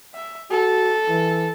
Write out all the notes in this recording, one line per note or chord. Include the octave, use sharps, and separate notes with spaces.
E5
F#4 A4
E3